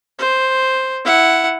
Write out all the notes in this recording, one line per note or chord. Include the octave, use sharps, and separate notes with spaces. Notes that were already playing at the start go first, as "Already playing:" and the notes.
C5
E4 F#5